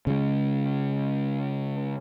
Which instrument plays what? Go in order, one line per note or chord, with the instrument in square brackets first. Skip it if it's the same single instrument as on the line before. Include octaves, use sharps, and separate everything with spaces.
[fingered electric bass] C#3 G#3